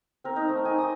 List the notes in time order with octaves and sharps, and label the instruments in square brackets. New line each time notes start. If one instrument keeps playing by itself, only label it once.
[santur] C4 A#4
D#4
A3
D#4 G#5
D#5 D#6